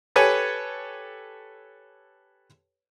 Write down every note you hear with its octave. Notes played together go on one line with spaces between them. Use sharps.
G4 A4 B4 C#5 G#5